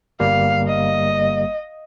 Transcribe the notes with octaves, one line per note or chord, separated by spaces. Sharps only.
G1 G3 A#3 F5
D#5